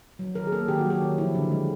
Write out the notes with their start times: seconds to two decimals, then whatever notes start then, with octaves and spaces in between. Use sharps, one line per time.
0.19 F#3
0.35 D#3 A#4
0.47 G#4
0.52 A#3 A4
0.68 D#3 G4
0.79 F#4
0.85 F#3
0.90 G4
1.01 D#3
1.18 F3 E4
1.35 D3
1.51 G#3